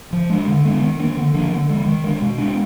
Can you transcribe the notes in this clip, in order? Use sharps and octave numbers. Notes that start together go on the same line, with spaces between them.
F3
G#3 D4
D3
G#3 B3 D4
D#3
A#3 D4
D3
F3 A#3 D4
D3
F3 G#3
D#3
G#3 D4
B2
G#3 B3 D4